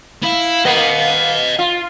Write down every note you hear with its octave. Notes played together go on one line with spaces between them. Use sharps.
E4 F5
A#3 B3 D#5 F#5
F4